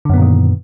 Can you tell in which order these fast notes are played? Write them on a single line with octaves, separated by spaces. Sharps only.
D3 F#2 B3 A#2 D#3